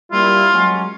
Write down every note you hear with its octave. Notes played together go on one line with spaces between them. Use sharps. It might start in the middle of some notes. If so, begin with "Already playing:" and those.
G3 A#3 E4 F4
F#3 G#3 C#4